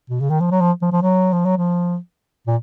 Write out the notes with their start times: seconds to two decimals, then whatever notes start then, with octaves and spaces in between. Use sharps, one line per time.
0.10 B2
0.20 C#3
0.30 D#3
0.40 F3
0.51 F#3
0.61 F3
0.82 F3
0.92 F3
1.02 F#3
1.33 F3
1.45 F#3
1.57 F3
2.47 A#2